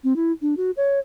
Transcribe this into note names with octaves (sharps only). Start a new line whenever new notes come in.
C4
E4
D4
F#4
C#5